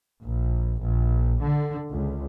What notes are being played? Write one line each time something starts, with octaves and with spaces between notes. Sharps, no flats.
A#1
A#1
D3
C#2